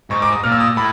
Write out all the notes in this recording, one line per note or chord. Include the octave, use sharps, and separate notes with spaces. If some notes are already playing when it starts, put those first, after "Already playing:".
G#2 C#6
D6
D#6
A#2 F6
E6
D#6
A2 B5